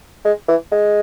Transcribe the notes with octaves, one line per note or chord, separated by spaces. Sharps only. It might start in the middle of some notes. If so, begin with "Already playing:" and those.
G#3
E3
G#3